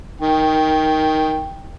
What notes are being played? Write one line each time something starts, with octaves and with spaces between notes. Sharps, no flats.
D#3 G5